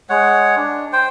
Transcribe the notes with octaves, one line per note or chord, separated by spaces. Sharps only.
G#3 C#5 F#5
D4
C5 G5